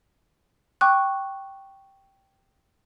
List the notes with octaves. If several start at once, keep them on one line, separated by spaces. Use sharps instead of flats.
G5 C#6 D6 F#6